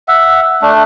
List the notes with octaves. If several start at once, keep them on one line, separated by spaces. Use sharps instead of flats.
E5 F#5
A3 D4